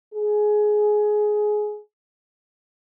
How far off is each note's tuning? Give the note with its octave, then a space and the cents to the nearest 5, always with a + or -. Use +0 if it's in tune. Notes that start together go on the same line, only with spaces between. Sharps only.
G#4 +15